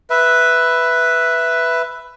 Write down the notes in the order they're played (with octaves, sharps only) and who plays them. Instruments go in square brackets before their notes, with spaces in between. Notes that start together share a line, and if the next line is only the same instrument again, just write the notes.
[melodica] B4 E5